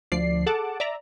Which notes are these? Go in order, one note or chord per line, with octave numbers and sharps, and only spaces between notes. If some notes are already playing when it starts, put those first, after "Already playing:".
D2 F3 D5 C7
G#4 A4 F#5 A5 D6
D5 E5 A#5